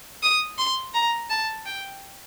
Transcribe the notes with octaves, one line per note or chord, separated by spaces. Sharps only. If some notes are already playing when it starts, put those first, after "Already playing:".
D#6
C6
A#5
A5
G5